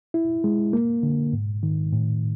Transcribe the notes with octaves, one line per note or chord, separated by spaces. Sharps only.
E4
G#3
A#3
D3
G#2
D#3
A2